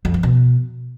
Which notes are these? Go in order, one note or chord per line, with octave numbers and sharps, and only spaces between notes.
F2
F3
B2